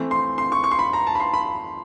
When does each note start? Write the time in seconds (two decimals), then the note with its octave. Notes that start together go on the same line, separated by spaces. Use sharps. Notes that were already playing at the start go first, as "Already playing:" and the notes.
Already playing: E3 A3 C4
0.11 C6
0.38 C6
0.52 C#6
0.64 C#6
0.71 C6
0.79 B5
0.93 A#5
1.07 A5
1.15 B5
1.20 C6
1.34 B5